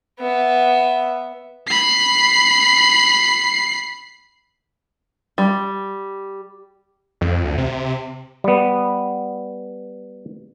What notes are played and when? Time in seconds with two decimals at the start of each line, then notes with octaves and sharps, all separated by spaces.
0.20 B3 E5
1.67 B5 C7
5.38 G3
7.21 F2
7.44 D2
7.58 C3
8.44 G3 B3